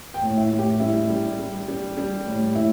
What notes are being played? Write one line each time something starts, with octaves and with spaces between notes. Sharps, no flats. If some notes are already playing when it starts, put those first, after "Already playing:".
G5
A2
E4
A2
G4
G3 E4
G3
G3
G3
G3
A2
A2 E4